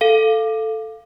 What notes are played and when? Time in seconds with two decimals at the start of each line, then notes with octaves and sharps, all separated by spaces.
0.01 A4 F5